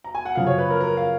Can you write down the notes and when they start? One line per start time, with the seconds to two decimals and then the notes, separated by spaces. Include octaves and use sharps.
0.04 A#5
0.15 G#5
0.26 F#5
0.35 F#2 C#3 F3 F5
0.47 C#5
0.58 B4
0.70 A#4
0.81 A#4
0.97 F5